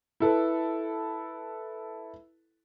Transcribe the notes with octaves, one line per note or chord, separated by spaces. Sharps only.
E4 A4 B4